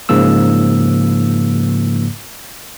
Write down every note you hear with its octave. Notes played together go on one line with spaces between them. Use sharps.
G#2 C#3 F3 A#3 E6